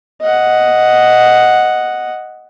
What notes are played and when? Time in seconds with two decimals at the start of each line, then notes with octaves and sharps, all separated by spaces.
0.21 D#5 F#5